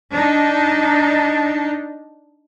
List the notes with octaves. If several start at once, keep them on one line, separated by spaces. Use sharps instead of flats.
D4 D#4